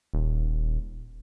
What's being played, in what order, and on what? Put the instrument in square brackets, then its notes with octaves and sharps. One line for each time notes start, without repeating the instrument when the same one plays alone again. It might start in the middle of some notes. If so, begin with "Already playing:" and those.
[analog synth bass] D#1